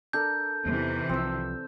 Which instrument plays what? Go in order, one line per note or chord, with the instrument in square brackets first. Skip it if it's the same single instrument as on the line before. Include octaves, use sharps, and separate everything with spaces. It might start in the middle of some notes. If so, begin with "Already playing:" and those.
[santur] D4 A4 A#4 [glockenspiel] G6
[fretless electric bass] E2 B3 [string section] C3 D#3 E3
[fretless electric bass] C2 F3 [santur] C4 E6